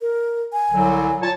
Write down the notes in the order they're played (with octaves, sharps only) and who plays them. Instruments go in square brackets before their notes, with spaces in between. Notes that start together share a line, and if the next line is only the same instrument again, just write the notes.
[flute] A#4
G#5
[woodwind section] C2 D3 F#3
A#2 C#5 A5